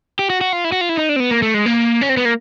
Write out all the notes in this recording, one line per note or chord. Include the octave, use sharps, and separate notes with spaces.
G4
F#4
F#4
F4
E4
F#4
F4
E4
D#4
D4
C4
B3
A#3
A3
G#3
A#3
C#4
C4
B3
A#3